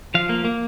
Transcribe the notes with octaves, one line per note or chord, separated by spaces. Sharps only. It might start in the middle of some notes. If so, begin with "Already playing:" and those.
F3 F5
A#3
A#3